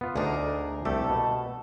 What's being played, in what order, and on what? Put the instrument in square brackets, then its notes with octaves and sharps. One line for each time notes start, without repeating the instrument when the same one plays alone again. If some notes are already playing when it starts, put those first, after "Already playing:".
[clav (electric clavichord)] B3 F4
[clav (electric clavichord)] D2 D4 D#4 [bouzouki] G#4 A#4
[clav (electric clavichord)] C2 A3 G4 [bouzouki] A4
[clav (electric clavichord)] B2